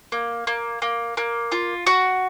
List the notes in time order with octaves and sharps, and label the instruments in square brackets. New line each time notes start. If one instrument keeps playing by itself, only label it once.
[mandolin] A#3
A#3
A#3
A#3
F4
F#4